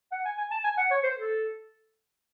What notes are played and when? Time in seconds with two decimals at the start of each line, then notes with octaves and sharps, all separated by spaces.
0.12 F#5
0.25 G#5
0.38 G#5
0.51 A5
0.64 G#5
0.77 F#5
0.90 C#5
1.03 C5
1.17 A4